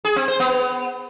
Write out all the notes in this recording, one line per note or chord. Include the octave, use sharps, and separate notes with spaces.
G#4
C4
C5
B3